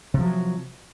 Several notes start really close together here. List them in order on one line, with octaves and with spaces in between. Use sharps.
C3 F3 F#3